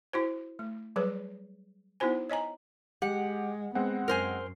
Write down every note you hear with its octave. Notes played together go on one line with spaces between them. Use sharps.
E4 F#4 C5
A3
F#3 G3 G#4 B4 C#5
B3 D#4 E4 F#4 C5 G#5
C#5 D#5 G#5 A#5
G#3 G4 F#5
G#3 B3 C4 F#5
F#2 A#4 C5 G#5